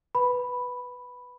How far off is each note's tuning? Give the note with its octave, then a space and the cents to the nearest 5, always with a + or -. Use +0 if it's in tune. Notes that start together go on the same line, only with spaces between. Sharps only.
B4 +0 B5 +0